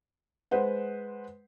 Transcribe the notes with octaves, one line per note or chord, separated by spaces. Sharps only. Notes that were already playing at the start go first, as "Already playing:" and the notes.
G#3 B4 C5 F#5